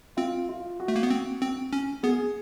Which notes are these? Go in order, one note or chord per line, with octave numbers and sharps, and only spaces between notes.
C4 F4
F4
F#4
A3
A#3
B3
C4
C4
C#4
B3 G#4